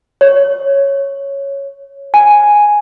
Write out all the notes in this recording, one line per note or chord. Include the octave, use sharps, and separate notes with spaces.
C#5
G#5